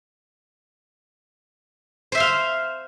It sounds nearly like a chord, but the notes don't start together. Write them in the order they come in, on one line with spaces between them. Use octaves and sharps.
C5 E5 C6 F5